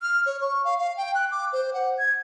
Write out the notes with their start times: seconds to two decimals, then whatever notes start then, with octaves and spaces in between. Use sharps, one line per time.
0.02 F6
0.26 C#5
0.42 C#6
0.65 F5
0.78 F5
0.97 G5
1.15 F#6
1.31 D6
1.53 C5
1.74 F#5
1.99 G#6